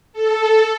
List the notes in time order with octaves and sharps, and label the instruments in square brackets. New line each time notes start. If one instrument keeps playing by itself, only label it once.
[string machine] A4